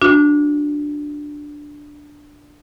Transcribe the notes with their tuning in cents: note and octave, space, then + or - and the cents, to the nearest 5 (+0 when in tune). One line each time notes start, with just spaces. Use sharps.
D4 +0 F#4 -20